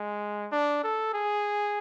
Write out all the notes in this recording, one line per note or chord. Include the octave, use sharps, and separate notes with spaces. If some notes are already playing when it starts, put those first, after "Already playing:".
Already playing: G#3
D4
A4
G#4